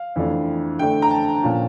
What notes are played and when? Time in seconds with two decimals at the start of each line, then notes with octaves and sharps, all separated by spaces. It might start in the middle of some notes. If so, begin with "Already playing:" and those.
Already playing: F5
0.16 F2 E3 A3 D4
0.79 D3 A3 D4 G5
1.02 A#5
1.11 A5
1.43 A#2 F3 C#4